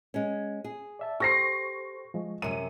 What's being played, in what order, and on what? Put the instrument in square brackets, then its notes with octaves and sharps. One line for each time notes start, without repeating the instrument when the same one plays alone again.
[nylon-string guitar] G#3 C#4
G#4
[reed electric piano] D5 E5 A5
[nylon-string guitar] G4 [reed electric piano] A4 C5 C6 [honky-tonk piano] C#6 A#6 C7
[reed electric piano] F3 G#3
[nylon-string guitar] F#2 C3 [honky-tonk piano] D#7